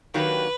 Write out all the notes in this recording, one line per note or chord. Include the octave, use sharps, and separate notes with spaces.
D#3 F#3 A#3 D4 G4 B4